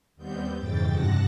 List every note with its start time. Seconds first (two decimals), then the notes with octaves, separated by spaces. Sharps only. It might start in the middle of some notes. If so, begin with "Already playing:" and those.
0.16 D#2 G3 B3 C4 G6
0.57 F2 G#2 C#3 E3 G5 A6
0.90 G2 C3 F#5 A5 A#6